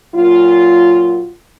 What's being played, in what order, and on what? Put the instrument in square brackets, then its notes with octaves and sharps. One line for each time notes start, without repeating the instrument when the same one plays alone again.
[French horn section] F#2 A#2 F#3 F4